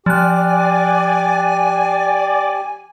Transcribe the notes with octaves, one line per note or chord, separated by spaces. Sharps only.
F3 G4 D5 G#5 F#6